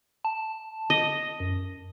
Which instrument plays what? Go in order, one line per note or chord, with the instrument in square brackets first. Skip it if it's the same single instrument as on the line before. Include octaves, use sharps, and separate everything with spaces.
[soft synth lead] A5
[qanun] D#5
[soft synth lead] F#2